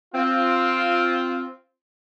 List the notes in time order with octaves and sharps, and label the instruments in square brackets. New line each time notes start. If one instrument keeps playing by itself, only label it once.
[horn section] C4 F4